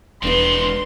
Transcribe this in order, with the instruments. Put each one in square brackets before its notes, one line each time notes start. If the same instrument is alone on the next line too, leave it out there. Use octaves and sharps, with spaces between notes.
[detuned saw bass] E1 [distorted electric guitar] D#3 C4 [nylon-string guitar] B3 D4 B4 [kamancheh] C6